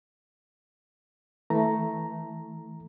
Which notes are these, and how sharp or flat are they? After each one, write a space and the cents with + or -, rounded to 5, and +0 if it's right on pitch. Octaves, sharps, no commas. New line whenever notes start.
E3 -15 A3 +0 A#5 +0